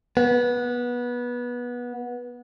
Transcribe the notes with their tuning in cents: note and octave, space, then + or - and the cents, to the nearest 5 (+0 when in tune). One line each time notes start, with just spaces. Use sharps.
B3 -20